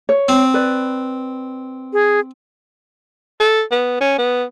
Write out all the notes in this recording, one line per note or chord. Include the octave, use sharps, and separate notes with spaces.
C#5
C4
B4 D5
G#4
A4
B3
C#4
B3